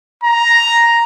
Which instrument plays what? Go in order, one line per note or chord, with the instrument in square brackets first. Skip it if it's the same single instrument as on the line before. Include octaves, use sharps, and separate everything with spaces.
[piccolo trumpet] A#5